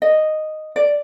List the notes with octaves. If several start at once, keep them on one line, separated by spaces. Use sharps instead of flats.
D#5
D5